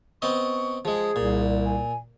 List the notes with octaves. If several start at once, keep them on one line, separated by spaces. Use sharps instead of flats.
B3 C4 D#5 C#6
F3 G#3 G#4
C2 A#2
G#5